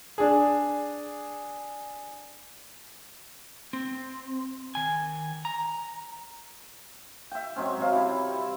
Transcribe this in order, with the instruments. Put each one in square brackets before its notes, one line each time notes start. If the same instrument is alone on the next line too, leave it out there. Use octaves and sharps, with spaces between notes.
[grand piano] D4 G#4
[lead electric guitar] C4
D#3 G#5
A#5
[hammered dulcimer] E5 G5
F#3 G#3 C4 C#4
C3 F#3 F5
G3 E4
E5